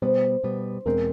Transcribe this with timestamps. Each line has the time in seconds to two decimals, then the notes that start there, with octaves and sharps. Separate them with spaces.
0.02 B2 G3 B3 C5
0.44 B2 G3 B3
0.86 E2 B2 G#3 C4 A#4